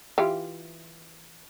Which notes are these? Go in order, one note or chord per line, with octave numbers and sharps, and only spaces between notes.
E3 F4 G4